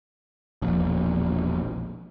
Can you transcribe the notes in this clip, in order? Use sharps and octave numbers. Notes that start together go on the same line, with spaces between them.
E1 A#1